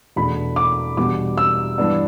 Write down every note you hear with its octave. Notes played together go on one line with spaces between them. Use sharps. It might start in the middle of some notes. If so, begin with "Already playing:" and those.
E2 B2 A3 D4 B5
D6
E2 B2 G3 B3 D4 D6
E6
G2 E3 B3 D4